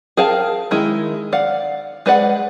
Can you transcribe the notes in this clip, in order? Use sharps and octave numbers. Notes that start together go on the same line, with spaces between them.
G#4 A#4 F5 G5 A5
D#3 G#3 E4
D5 F5 F#5
G#3 B4 D5 F#5